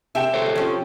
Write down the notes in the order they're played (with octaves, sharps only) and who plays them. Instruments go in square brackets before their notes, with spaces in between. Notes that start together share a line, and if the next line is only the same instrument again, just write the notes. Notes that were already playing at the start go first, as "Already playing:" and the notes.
[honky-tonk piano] C3 G5 E7 [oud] E5
[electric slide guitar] A4 C5 C#5
[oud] F3 C#4